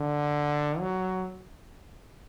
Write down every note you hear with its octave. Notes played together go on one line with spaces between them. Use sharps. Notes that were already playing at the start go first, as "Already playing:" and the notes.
Already playing: D3
F#3